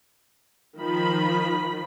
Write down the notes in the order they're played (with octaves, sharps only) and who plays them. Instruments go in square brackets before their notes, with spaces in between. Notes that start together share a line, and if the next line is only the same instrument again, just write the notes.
[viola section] D#3 F3 B5